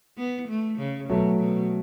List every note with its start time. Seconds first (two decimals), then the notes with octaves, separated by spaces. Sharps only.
0.17 B3
0.48 A3
0.78 C#3
1.09 B2 F#3 A3
1.39 B2